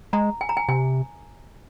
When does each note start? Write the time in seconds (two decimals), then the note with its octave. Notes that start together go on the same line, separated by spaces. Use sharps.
0.13 G#3 A#5
0.41 G#5
0.49 A#5
0.57 G#5
0.68 C3 G#5